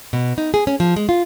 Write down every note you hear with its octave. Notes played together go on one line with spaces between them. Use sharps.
B2
D#4
G#4
C#4
F3
G#3
F4